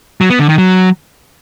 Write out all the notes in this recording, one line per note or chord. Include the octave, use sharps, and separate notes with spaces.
F#3
B3
D3
D#3
F#3